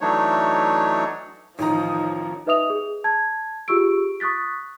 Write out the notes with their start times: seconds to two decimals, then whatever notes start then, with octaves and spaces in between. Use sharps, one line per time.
0.01 E3 F#3 A3 D4 D#4 C#5
1.59 A1 D#3 F3 D#4 A#5
2.47 D#4 B4 D#5 E5 D#6 F7
2.70 G#4
3.04 A5 G#6
3.68 F4 G4 G#4 C#6 E6 D7
4.20 C#6 D#6 F#6 A6 B6